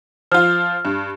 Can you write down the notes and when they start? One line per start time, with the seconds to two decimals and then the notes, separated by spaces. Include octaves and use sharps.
0.32 F3 F4 F6
0.85 G2